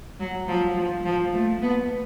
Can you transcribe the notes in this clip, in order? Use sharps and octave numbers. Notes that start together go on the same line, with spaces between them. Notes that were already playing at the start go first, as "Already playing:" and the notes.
F#3
F3
F3
F3
A3
B3